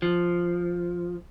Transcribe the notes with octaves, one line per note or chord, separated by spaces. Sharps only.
F3